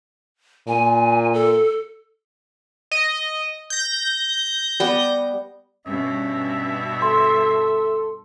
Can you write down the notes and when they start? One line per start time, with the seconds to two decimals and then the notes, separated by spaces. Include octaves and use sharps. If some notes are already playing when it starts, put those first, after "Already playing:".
0.68 A#2 G#5
1.34 A4
2.91 D#5
3.70 G6 A#6
4.80 G3 B3
5.86 G2 B2 C#4 E5
7.02 A4 C6